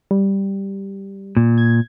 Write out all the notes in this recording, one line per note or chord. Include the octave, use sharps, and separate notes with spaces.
G3
A#2
G#6